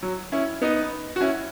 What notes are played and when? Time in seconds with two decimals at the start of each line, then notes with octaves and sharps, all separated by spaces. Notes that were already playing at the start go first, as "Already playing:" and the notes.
0.03 F#3
0.32 C#4 E4
0.62 B3 D#4
1.16 F#4
1.21 C#4 E4